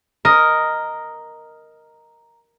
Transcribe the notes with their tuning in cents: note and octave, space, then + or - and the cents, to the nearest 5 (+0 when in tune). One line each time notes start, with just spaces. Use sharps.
A#4 +0 D#5 +0